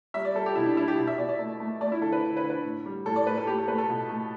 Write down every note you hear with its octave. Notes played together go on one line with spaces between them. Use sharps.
G3 E5
D5
G3 A4
G4
B2 E4
D4
G3 E4
G4
B2
E5
B2 D5
D5
A3
A3
A3 D5
E4
D3 A4
B4
D3
B4
D3
B4
A2
G3
A2 A4
D5
A2 B4
A4
A3 G4
A4
A3 B4
A4
B2
A3